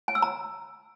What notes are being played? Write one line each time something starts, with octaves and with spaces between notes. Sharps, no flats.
G#5
E6
A#5